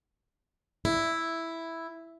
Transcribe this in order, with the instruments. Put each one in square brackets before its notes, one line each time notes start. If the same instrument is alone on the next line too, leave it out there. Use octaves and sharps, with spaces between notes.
[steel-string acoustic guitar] E4